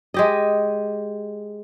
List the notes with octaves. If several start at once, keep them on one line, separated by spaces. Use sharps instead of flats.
G#3 G4 D#5